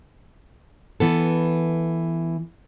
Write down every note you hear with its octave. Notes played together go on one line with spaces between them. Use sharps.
E3 B3 A4